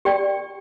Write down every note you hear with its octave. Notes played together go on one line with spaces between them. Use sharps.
G4 D5 G5